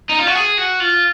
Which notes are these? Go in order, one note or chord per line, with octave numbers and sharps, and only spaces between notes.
D#4
F4
F#4
G#4
F#4
F4